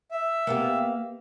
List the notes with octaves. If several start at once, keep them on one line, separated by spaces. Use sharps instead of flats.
E5
A#3 B3 G4